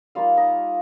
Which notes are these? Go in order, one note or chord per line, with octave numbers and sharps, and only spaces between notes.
G3 A#3 D#4 F4 F5
D#4 D#5